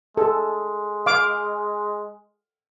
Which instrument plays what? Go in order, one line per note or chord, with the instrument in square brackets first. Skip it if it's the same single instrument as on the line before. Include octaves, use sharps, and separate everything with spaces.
[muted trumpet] G#3 [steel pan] A4
[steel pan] F5 D6